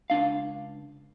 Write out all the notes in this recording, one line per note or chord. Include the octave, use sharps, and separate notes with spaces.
C#2 D4 F5